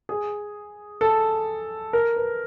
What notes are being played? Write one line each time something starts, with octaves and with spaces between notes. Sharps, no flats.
G#4
A4
A#4
B4